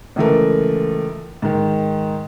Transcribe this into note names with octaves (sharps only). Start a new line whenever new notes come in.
C#2 E3 A3 A#4
G#2 D#3